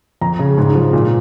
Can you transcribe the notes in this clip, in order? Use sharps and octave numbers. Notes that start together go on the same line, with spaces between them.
F2 A#5
C#3
G#2
F3
A#2